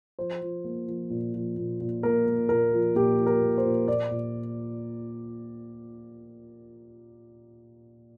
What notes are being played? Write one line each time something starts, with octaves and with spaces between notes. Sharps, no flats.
F3 C5
F3
A#3
F3
A#2
F3
A#2
A#2
A#3 A#4
A#3
A#2 A#4
F3
A#2 G4
F3
A#4
A#3
C5
A#2
A#2 D5
A#2